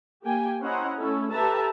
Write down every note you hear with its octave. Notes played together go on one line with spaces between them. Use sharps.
A#3 G4 G5 G#5
C#4 E4 C5 D#5 F#5 A#5
A3 C#4 E4 A4
G4 A4 B4 E5 A5 A#5